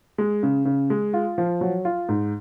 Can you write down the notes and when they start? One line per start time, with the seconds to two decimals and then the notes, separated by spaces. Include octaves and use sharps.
0.18 G#3
0.43 C#3
0.65 C#3
0.90 G#3
1.14 F4
1.38 F3
1.61 F#3
1.85 F4
2.09 G#2